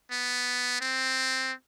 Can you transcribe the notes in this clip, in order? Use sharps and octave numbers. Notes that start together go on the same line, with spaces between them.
B3
C4